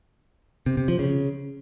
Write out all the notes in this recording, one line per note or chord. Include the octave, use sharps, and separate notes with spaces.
C3
C3
F3
C#3